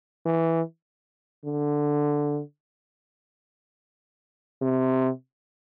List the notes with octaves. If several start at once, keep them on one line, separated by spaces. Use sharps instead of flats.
E3
D3
C3